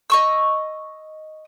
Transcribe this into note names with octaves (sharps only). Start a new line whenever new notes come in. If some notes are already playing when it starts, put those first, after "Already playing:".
D#5 C#6 E6